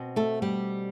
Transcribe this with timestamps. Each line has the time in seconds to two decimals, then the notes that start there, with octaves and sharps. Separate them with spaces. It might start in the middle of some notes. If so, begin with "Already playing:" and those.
Already playing: B2 C4
0.16 A3 A4
0.42 G3 G4